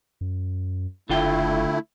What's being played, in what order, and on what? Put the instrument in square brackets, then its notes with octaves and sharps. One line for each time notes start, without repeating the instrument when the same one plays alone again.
[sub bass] F#2
[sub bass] F#1 [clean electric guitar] D3 F4 G5 [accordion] A3 E4